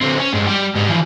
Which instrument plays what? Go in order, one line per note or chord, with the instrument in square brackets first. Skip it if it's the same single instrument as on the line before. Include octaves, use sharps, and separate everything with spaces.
[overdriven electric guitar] D3 C4
C#4
G2 G#3
G3 G4
G#2 G3
E3 F3